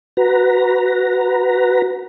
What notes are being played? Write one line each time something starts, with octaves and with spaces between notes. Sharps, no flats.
F#4 B4 A#5